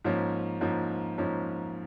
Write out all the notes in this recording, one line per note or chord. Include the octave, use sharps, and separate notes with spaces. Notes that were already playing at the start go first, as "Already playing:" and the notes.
G#2 F3 A#3 C#4
G#2 F3 A#3 C#4
G#2 F3 A#3 C#4